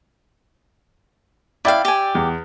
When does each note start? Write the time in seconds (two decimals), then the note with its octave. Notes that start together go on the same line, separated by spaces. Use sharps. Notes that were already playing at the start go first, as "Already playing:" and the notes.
1.65 E4 D5 E5 F5 G5
1.85 G4 G#5
2.15 E2